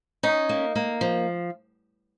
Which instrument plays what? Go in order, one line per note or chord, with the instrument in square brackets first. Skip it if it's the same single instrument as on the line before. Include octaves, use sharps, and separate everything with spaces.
[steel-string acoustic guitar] C#4 [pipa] D#4
[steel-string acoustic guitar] A#3
A#3
F3